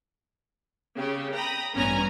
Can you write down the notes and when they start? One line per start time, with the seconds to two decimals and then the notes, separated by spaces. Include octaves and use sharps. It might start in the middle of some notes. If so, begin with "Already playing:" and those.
0.97 C#3 G4
1.34 G5 A#5 B5 D#6
1.76 A1 G2 B3 C#4 G#5 A#5